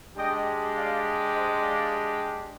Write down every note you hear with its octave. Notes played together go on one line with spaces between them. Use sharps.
G#3 D4 G4 D#5 G5
D5 F5
C5 D#5
D5 F5